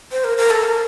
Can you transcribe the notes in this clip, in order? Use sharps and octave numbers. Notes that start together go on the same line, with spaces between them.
C5
A#4
A#4
A4
A#4